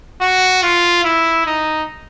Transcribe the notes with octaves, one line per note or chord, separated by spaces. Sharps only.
F#4
F4
E4
D#4